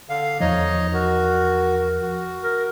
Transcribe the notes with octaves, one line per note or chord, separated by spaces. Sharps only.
D3 F5
E2 F3 D#4 C#5 D#5
F#4 A#4
F#4
A#4